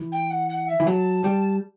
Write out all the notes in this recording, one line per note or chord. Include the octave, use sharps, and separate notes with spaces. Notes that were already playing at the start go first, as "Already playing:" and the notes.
Already playing: E3
G5
F#5
F#5
E5
E3
F#3 A5
G3